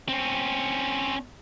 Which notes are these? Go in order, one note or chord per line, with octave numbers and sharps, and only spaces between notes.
C4 C#4